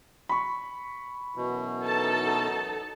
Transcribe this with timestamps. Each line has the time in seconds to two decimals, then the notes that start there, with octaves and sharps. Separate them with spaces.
0.29 B5 C#6
1.37 F#2 B2 E3 F#4
1.83 D#4 A4 A5